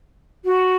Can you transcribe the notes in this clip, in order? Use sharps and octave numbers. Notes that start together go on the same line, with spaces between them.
F#4